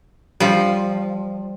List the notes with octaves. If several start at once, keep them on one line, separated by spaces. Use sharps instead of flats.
F3 G3